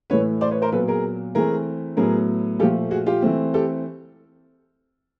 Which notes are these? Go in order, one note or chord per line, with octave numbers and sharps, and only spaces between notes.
A2 E3 A3 B4 C#5
C5 D5
B4 C#5
A#4 C5
A#2 F#3 B3 A4 B4
G#4 A#4
E3 A3 C4 G#4 A#4
A2 F#3 B3 G#4 A#4
A#2 F3 A3 G4 A4
F#4 G#4
F4 G4
E3 A3 C4
G4 A4